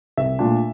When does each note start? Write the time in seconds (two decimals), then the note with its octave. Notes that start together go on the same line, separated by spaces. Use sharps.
0.17 C2 E5
0.39 A#2 A3 D4 F4